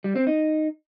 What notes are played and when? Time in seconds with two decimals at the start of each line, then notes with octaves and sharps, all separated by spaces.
0.04 G3
0.16 C4
0.27 D#4